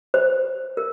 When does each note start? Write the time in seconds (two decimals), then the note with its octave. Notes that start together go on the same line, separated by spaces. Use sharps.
0.14 C5
0.77 A#4